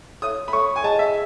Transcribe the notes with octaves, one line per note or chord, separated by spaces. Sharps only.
A4 C#5 E5 D#6
B5
A4 C#5 E5 C#6
G#5
G#4 D#5 F#5 A5
E5